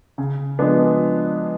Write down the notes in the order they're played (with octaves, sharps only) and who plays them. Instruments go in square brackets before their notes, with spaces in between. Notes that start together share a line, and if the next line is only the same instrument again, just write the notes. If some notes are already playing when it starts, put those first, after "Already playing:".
[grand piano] C#3
F3 G#3 B3 D4